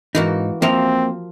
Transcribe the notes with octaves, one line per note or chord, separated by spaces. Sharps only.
G#2 E3 A#3 D#4 F#4
F3 A#3 C4 A#4 E5